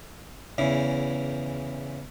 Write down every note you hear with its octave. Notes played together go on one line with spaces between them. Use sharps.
E2 C#3 E3